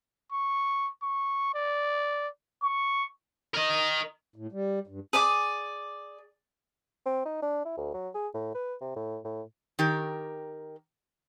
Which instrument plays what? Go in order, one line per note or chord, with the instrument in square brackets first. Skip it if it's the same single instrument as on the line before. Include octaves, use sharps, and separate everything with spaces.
[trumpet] C#6
C#6
D5
[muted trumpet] C#6
[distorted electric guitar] A#4 D#5
[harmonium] A2
G3
G2
[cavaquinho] G#4 D5 G#5 D6
[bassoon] C4
D#4
D4
E4
D2
F#3
G#4
A2
B4
C3
A2
A2
[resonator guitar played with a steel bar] D#3 G4 A#4